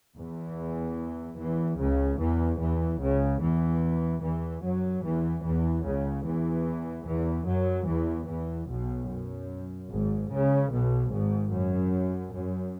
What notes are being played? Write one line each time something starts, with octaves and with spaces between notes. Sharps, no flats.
E2 E3
E2 E3
C#2 C#3
E2 E3
E2 E3
C#2 C#3
E2 E3
E2 E3
F#2 F#3
E2 E3
E2 E3
C#2 C#3
E2 E3
E2 E3
F#2 F#3
E2 E3
E2 E3
B1 B2
F#2
G#1 G#2
C#2 C#3
B1 B2
G#1 G#2
F#2
F#2